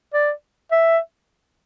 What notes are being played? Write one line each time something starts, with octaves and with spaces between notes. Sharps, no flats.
D5
E5